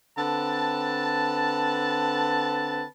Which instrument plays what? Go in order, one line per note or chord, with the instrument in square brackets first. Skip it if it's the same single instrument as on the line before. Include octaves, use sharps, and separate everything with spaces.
[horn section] D3 C4 B4 A5